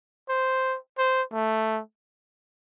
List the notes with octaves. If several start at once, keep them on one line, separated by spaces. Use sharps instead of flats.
C5
C5
A3